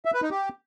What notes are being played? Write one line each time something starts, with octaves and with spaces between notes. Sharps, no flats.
E5
B4
D#4
G4